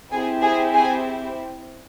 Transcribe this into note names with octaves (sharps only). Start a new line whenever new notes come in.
C4 E4 G4 G#4 G#5
G#4 G#5
G#4 G#5